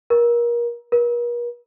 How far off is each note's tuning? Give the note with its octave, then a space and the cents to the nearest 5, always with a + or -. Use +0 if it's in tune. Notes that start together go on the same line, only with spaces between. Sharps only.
A#4 +30
A#4 +45